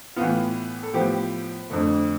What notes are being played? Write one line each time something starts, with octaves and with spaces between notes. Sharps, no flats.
A2 E3 B3 F4
A4
A2 F3 B3 G4
F2 D3 A3